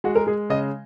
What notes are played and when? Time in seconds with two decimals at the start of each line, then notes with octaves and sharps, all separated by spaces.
0.04 G#3 F#4
0.15 A#4
0.27 G#3 G#4
0.50 C#3 D#5